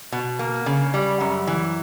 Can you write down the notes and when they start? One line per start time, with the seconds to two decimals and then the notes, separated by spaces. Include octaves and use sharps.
0.12 B2
0.39 A#3
0.66 C#3
0.94 G3
1.20 F#2
1.47 E3